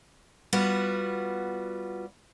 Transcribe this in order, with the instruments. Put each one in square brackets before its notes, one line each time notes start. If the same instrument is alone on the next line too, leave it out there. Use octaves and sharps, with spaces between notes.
[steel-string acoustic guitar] G3 B3 F4 F#4